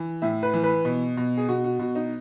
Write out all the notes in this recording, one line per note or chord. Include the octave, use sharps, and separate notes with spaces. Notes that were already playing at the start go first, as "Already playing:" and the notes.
Already playing: E3
A2 E5
B4
E3
B4
B2
B2
G#4
B2 F#4
F#4
B2 F#4
D#4